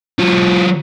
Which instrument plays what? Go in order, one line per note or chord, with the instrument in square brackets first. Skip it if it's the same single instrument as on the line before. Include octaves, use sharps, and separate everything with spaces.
[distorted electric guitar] F#3 F4